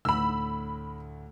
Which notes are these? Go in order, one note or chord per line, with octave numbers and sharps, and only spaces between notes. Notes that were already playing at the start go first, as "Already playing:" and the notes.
D2 A2 B5 E6